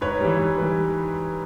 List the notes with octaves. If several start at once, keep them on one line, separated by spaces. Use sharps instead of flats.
G#2 B4 C#5
E3 G3
G#2
E3 G3